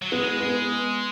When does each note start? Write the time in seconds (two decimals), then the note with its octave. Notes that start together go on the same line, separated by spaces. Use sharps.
0.02 F#3
0.12 G#3 B3
0.40 B3